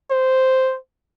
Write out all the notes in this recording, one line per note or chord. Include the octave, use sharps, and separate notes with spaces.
C5